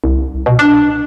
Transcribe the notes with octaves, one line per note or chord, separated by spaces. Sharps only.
C2
B2
D4